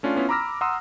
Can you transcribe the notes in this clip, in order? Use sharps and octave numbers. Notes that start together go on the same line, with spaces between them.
A3 C#4 D4 F4
B3 C#4 E4 F4
A#5 B5 D6 E6 F6 A#6
F#5 A#5 C6 D#6 E6